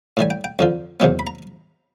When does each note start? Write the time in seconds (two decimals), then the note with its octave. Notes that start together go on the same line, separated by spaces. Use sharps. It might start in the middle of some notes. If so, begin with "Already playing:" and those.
0.17 A2 E3 G3 G#5
0.30 G5
0.44 G5
0.59 F2 D3 F3
1.00 E2 C3 D#3 F#3 B3
1.19 B5
1.27 A#5